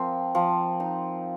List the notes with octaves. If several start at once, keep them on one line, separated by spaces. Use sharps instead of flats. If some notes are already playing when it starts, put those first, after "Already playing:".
Already playing: F3 C4 A#4
F3
D#4